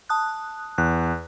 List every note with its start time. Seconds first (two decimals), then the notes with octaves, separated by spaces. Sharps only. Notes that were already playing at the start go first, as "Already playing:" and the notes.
0.09 A5 D#6 F#6
0.78 E2 F#6